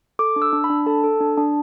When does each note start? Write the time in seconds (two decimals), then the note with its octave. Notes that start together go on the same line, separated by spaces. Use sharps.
0.19 A4 D6
0.36 D4
0.42 E6
0.53 D4
0.64 B5
0.70 D4
0.86 A4 A5
1.04 A4
1.21 D4
1.38 D4